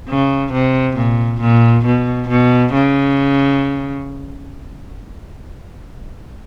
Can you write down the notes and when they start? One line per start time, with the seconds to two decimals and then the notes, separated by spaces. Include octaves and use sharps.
0.09 C#3
0.53 C3
0.96 A#2
1.41 A#2
1.86 B2
2.29 B2
2.73 C#3